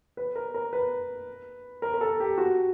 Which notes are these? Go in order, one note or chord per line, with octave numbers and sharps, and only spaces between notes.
B4
A#4
A#4
B4
A#4
A#4
A4
G4
F#4